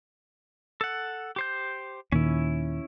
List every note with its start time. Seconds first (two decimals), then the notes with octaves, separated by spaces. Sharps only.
0.81 A4 F#5
1.36 G4 C5 G6
2.12 D#2 A#2 D#3 C#4 E4